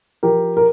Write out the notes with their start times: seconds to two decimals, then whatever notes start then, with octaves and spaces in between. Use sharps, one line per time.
0.23 F3 G4 A#4
0.57 A#4